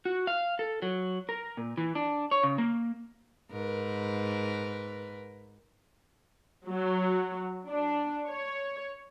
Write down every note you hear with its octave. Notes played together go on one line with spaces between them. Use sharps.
F#4
F5
A4
F#3
A#4
A#2
E3
D4
C#5
C#3
A#3
G#2 A#4 B4
F#3
D4
C#5